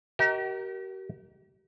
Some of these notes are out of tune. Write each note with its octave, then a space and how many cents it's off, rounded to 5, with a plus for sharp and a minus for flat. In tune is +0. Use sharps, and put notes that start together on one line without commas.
G4 -45 A#4 +10 D#5 +25